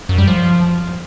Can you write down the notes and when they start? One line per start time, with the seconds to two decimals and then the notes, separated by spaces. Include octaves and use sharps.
0.09 F#2
0.18 G3
0.27 F3